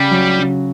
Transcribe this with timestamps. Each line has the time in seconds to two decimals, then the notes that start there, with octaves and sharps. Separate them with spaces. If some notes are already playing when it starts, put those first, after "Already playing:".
Already playing: C#3 G3
0.11 F#3
0.39 C#3